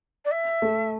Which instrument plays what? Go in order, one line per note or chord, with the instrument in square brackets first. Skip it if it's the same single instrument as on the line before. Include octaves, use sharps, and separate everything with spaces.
[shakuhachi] D5
E5
[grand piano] A3